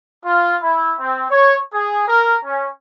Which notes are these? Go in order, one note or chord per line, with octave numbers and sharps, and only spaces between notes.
F4
E4
C4
C#5
G#4
A#4
C#4